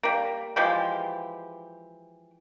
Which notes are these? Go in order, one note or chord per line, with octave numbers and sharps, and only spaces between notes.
G3 A#3
E3 F3 G#3 G4